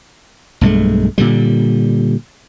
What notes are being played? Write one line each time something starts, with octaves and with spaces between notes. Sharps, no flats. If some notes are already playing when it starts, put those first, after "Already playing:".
B1 G2 G#3 A3
A#2 D3 G3